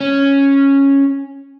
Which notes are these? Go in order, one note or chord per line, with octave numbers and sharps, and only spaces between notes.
C#4